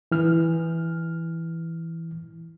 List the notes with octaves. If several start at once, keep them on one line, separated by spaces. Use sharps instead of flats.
E3 F6